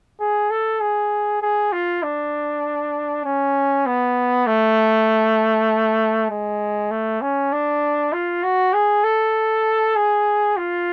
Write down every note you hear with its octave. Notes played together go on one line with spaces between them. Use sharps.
G#4
A4
G#4
G#4
F4
D4
C#4
B3
A3
G#3
A3
C#4
D4
F4
F#4
G#4
A4
G#4
F4